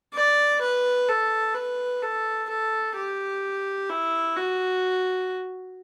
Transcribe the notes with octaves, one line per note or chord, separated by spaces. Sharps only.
D5
B4
A4
B4
A4
A4
G4
E4
F#4